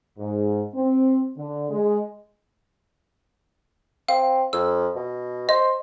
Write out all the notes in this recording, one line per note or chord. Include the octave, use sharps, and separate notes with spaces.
G#2
C4
D3
G#3
C4 F5
F2 E6
B2
C5 D#5